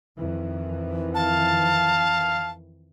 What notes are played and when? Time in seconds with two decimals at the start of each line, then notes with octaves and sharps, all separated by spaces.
0.18 F2 D#3 E3
1.15 F5 A5